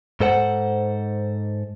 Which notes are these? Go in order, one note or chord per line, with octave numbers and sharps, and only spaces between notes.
G#2 A4 C5 F#5